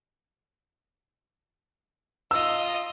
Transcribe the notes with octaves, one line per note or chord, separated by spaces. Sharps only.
F4 D#5 E6